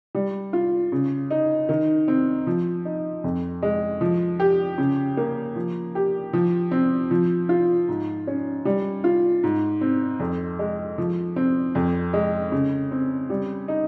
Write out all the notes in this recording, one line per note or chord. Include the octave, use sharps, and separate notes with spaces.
G3
F4
C#3
D#4
D#3
C4
F3
D#4
F2
G#3
F3
G4
C#3
A#3
F3
G4
F3
C4
F3
F4
G#2
C#4
G3
F4
G#2
C4
F2
G#3
F3
C4
F2
G#3
C#3
C4
G3
D#4